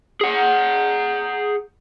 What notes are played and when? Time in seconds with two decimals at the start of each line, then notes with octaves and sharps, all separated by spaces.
0.21 G#4 F#5